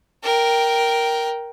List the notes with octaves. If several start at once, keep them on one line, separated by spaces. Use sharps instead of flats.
A#4 G5